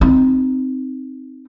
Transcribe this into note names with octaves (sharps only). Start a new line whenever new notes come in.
C4 D#4